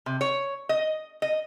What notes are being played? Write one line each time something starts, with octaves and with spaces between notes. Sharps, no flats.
C3
C#5
D#5
D#5